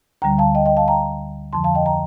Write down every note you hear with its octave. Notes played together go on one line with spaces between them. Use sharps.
D2 D3 G3 G5 A#5
F5 A5
D#5 G5
D#5 G5
F5 A5
G5 A#5
F2 D3 F3 A5 C6
F5 A5
D#5 G5
G5 A#5